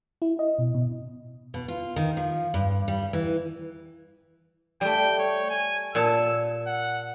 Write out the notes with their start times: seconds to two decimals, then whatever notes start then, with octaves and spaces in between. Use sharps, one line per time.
0.22 E4
0.39 D#5
0.59 B2
0.74 B2
1.54 B2
1.68 F4
1.96 D#3
2.17 F3
2.54 G2
2.88 G3
3.13 E3
4.81 G3 A3 G5
5.19 C#5
5.50 G#5
5.95 A#2 C#5 A5 E6
6.67 F#5